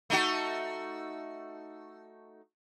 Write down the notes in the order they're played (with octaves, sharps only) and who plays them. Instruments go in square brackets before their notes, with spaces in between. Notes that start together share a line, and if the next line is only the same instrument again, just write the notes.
[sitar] A3 D#4 F#4